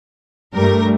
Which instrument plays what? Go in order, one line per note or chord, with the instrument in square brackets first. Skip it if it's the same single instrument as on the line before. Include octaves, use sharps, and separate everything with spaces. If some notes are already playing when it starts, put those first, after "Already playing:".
[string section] G2 A#4 [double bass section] G3 A3